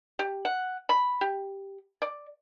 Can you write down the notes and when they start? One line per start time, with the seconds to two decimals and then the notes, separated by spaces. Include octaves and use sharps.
0.19 G4
0.45 F#5
0.89 B5
1.21 G4
2.02 D5